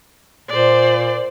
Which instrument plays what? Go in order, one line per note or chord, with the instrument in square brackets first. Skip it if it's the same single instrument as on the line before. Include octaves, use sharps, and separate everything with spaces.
[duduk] A#2 [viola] C5 D5